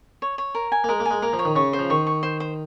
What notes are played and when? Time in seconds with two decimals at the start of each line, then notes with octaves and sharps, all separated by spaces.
0.22 C#5
0.38 C#5
0.55 A#4
0.72 G#5
0.84 A#3
0.89 G#3 A#4
1.00 A#3
1.05 G#5
1.11 G#3
1.22 A#3 A#4
1.33 F3
1.39 C#5
1.45 D#3
1.56 C#3 C#6
1.73 C5
1.79 F3
1.90 D#3 C#6
2.07 C#6
2.23 C5
2.40 C5